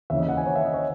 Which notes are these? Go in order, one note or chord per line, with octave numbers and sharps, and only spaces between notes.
D#2 C#3 E3 E5
D#5
F#5
G#5
C#5
E5
D#5
C#5